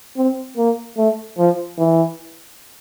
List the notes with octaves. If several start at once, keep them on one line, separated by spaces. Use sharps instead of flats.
C4
A#3
A3
F3
E3